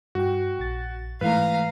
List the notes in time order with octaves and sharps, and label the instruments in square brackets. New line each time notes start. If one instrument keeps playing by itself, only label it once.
[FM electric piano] G2 G5 [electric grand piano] F#4
[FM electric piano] A#1 A6
[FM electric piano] G#2 E3 A3 [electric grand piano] B4 [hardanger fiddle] F5 A#5